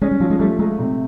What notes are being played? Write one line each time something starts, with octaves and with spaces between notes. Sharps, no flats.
G#3 C#4
G3
F3 F#3
G#3
G3 A3
G#3 A3
C3